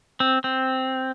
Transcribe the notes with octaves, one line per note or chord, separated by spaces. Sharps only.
C4
C4